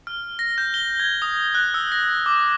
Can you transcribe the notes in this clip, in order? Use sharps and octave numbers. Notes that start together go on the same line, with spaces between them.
F6
A#6
G6
G7
G#6
D#6
F#6
E6
A#6
D6